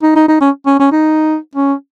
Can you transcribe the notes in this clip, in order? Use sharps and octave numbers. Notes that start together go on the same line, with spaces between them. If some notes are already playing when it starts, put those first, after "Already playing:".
D#4
D#4
D#4
C#4
C#4
C#4
D#4
C#4